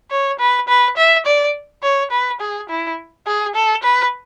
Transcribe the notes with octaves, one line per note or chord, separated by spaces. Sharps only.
C#5
B4
B4
E5
D5
C#5
B4
G#4
E4
G#4
A4
B4